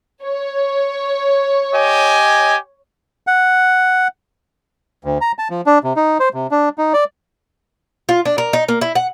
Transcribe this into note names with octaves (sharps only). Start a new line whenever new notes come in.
C#5
G4 D#5 G#5
F#5
D2
A#5
A5
F3
D4
C3
D#4
C5
C3
D4
D#4
D5
F4
D4
A#4
D#4
A#3
E4
F#5